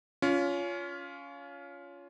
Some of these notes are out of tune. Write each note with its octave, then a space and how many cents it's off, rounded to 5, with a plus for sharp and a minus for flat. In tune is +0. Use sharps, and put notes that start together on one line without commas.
C#4 +25 F4 +0